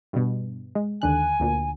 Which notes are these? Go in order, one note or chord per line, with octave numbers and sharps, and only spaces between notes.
G2 B2
G#3
D#2 D3 G#5 F#6
D2 A#2